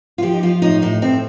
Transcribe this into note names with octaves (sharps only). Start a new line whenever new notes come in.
F4
F3 G4
D#4
F3 F4
A2 D#4
A2 D#4
A2 C4